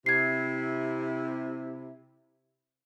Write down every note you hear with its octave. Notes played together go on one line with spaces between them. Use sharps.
C3 E4 G#6 C7